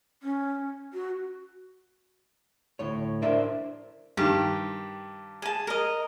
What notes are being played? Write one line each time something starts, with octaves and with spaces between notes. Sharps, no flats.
C#4
F#4
D2 A2 C#5
D4 A#4 C5 D5 E5
G2 D#3 G4
G#4 A5
A#4 D#5